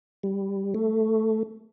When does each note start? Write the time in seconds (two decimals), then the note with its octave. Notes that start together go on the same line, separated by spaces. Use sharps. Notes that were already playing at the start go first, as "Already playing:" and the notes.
0.23 G3
0.74 A3